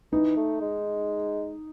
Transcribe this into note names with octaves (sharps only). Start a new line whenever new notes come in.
E3 D#4
A3
G#3